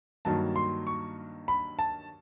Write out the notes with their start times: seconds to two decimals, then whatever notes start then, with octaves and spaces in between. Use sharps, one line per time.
0.25 G2 D#3 F#3 A#3 A5
0.56 C6
0.87 C#6
1.48 B5
1.79 A5